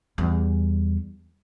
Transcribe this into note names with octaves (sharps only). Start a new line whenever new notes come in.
E2 G3